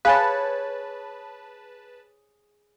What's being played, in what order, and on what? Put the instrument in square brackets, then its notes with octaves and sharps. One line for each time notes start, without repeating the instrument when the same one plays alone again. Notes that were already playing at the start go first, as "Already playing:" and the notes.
[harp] G#4 C#5 [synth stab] B4 A5 [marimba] F5 G#5